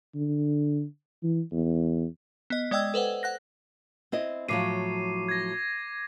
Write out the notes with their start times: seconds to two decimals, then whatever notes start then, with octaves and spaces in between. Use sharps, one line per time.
0.15 D3
1.23 E3
1.52 E2
2.50 B3 D#5
2.71 G#3 D5 D#5 G5 E6 G#6
2.94 A4 B4 C5 F#5
3.23 F#5 F#6 A#6
4.12 C4 E4 D#5
4.48 A2 F3 F#3 D6 C7 D#7
5.29 G#6 A#6